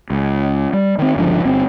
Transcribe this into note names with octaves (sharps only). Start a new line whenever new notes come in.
C#2
G3
D#3 C4
G1 C#2 D3 F3
G1 C4